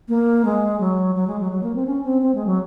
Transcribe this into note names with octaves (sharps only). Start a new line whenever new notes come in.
A#3
G#3
F#3
F#3
G#3
F#3
F#3
A#3
C4
C#4
C4
C4
G#3
F#3